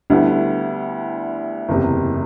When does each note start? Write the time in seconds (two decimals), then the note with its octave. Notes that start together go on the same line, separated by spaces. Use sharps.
0.10 D2 D3 G3 B3 E4
1.69 F#1 E2 C3